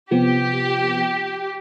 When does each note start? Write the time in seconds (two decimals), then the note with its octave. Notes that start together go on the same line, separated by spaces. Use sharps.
0.11 C3 F3 B3 G4